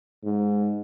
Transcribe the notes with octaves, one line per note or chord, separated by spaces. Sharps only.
G#2